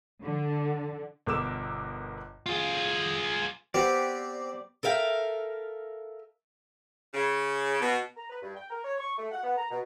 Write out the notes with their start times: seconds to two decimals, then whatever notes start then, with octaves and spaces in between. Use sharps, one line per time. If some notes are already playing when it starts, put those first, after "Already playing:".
0.24 D3
1.26 G1 B2 A#4 D6 E6 E7
2.46 F4 G#4
3.74 B3 C4 G4 B4 D5
4.83 A4 A#4 E5 F5 G5
7.14 C#3
7.81 B2
8.16 A#5
8.30 B4
8.43 G2
8.55 G5
8.70 A#4
8.84 C#5
8.99 C#6
9.18 A3
9.32 F#5
9.43 B3
9.57 A#5
9.71 B2